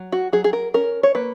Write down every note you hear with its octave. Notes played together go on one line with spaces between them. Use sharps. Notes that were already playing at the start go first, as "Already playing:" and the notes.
Already playing: F#3
F#4
F#3 G#4
G#4
A#4
C#4 A#4
C#5
A#3 B4